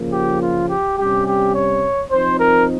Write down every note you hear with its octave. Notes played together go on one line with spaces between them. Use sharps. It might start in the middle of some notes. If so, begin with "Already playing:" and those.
Already playing: C#3 F3 A#3
G4
F4
G4
C3 G3 C#4 G4
G4
C#5
F3 C4 D#4 C5
A#4